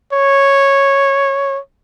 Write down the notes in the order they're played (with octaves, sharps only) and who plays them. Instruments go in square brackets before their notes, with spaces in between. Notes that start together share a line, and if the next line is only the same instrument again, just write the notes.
[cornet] C#5